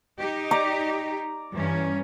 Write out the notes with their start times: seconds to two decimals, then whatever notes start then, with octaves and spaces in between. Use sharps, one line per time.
0.19 D#4 G4
0.51 D5 A#5
1.52 G2 E3 C#4